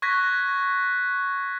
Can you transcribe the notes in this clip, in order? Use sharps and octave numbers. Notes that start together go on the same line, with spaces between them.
C#6 F#6 G#6 A#6 B6